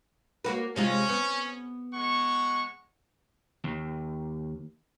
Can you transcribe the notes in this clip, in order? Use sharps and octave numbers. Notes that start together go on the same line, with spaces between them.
A#3 F#4 B4
C3 G#3 C#4 F4
B3
G#3 F#5 C#6
D#2